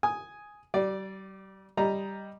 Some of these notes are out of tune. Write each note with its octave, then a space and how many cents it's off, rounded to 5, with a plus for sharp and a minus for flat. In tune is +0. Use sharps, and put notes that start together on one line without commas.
G#5 +0 D#6 +5
G3 -35 D5 +0
G3 +0 D#5 +0 A#5 +5